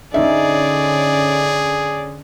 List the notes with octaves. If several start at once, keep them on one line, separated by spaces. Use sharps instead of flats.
D3 C#4 D#4 G#4 D5 E5